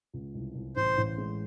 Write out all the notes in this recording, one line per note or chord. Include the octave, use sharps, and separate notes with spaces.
C#2
C2
C2
A1 C5
A1
G#3